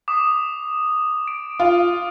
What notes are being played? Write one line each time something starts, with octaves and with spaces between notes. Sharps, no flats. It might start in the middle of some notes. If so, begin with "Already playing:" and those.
D6 D#6 E7
D7
F4